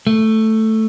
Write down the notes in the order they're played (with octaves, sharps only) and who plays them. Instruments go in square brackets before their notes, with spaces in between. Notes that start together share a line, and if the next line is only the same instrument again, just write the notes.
[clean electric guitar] A3